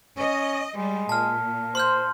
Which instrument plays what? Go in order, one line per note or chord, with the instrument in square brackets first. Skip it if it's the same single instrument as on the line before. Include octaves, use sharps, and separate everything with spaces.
[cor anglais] C#4 [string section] D#5
[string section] G3 [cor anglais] G#3
[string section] A#2 [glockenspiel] A5 F6
[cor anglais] C5 [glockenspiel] C6 F6 G6